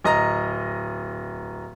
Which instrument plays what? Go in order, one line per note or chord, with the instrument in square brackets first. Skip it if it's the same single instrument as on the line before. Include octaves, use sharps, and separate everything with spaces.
[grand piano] D1 D#5 A#5 A#6